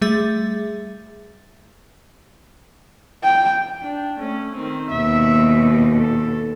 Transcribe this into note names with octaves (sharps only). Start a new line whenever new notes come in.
G3 A3 G#4 E5 A6
G5
D4
A3 C#4
D#3 C4
D#2 B2 E5
A4